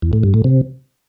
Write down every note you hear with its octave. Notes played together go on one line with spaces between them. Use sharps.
E2
A2
G2
A2
C3